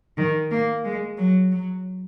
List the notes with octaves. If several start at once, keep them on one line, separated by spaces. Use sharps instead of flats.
D#3
A#3
G#3
F#3
F#3